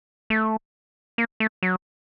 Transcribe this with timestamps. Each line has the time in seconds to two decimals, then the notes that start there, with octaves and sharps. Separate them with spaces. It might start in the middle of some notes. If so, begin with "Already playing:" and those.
0.30 A3
1.18 A#3
1.40 A3
1.63 F#3